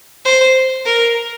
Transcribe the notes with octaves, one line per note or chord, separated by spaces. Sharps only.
C5
A#4